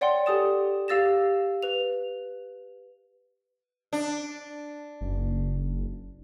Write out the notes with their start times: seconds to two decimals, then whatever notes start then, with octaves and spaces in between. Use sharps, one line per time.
0.01 C#5 D5 F#5 G5 C6
0.26 G4 A4 G#5 D#6 A6 E7
0.88 G4 F5 E6 A6 A#6 E7
1.63 B4 F7
3.93 D4
5.01 F#1